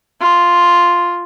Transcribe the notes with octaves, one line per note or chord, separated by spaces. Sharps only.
F4